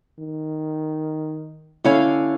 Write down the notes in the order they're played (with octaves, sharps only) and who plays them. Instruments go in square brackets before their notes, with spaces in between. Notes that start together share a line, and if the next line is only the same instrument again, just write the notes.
[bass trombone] D#3
[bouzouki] D3 C#5 F5 [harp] C#4 E4